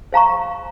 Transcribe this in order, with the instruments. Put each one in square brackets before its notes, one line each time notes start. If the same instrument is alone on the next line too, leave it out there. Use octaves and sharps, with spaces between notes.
[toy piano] C5 F5 A#5 C#6